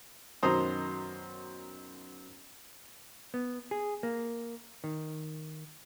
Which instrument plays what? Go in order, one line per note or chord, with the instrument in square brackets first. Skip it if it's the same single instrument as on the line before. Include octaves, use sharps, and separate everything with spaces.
[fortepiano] F#2 B2 D#3 C5 A#5 D#6
[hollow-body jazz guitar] B3
G#4
A#3
D#3